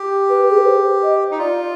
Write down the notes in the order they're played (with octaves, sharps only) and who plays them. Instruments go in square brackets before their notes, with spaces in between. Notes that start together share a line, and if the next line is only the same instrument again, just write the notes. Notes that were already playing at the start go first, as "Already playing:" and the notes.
Already playing: [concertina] G4
[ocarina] B4
G#4
B4
C5
D#5
[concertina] D#4
[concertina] F4 [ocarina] D5